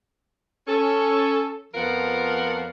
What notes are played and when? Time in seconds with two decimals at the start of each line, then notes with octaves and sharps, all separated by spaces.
0.68 C#4 A4
1.74 F2 F3 B3 A#4 F5 F#5